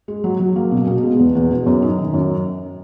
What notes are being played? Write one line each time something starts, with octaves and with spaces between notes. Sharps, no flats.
G#3
F#3
F#3
A#3
B2
B2
G#3
E2
E2
B2
F#2
D#4
D#3
F#2